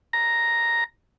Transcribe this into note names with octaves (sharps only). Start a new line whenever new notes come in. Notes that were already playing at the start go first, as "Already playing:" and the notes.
A#5